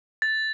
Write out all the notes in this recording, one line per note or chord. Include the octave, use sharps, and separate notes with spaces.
A6